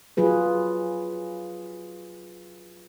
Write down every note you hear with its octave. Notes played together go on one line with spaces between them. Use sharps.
F#3 F4 G#4 B4